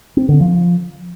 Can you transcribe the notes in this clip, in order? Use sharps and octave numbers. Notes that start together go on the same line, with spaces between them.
C4
D3
F3